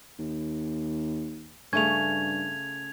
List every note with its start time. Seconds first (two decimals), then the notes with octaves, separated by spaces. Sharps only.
0.19 D#2
1.73 G2 C#3 A3 C#4 G#6 F7